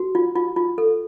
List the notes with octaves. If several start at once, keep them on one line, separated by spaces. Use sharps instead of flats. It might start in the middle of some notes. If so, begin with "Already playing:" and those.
Already playing: F#4
F4
F4
F4
A4